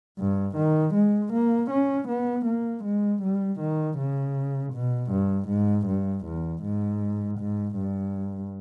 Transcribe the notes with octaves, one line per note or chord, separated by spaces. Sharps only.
G2
D#3
G#3
A#3
C#4
B3
A#3
G#3
G3
D#3
C#3
B2
G2
G#2
G2
E2
G#2
G#2
G2